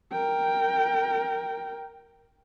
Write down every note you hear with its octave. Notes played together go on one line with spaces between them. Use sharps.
A#4 G5